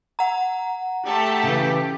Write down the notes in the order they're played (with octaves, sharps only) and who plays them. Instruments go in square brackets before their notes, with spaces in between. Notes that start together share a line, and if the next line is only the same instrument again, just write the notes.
[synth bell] F#5 A#5
[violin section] A3 A4 [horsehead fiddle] G4
[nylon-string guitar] C#3 E3